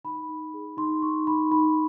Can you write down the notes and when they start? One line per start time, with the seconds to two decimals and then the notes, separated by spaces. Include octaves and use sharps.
0.04 D#4 B5
0.29 D#4
0.54 G#4
0.77 D#4 C6
1.02 D#4 C#6
1.27 D#4 B5
1.51 D#4 B5